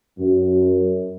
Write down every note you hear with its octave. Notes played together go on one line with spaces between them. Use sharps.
F#2